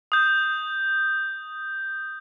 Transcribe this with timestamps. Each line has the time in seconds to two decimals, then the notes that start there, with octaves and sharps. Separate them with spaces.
0.12 D#6 G6